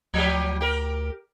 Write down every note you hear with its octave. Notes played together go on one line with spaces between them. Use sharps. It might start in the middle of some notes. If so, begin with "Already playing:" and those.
D2 F3 F#3 G4
G4 A#4